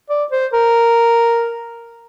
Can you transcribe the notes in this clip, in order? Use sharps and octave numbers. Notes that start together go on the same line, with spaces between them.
D5
C5
A#4